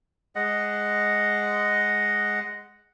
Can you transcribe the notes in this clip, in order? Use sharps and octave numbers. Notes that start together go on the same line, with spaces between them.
G#3 D#5 F#5